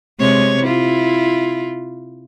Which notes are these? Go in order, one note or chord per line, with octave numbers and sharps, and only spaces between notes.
C3 G#3 C#5
E4 F4